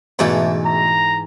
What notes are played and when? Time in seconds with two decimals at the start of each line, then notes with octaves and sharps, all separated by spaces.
0.19 E2 G#2 B2 E3 A3 A5
0.66 A#5